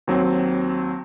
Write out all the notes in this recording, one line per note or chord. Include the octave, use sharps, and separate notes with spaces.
D#2 F#3 C4